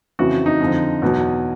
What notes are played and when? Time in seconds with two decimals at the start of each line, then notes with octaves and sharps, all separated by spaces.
0.19 F2 C#3 E3 F#4
0.46 D#4
0.60 F2 D3 F3
1.02 E2 B2 F#3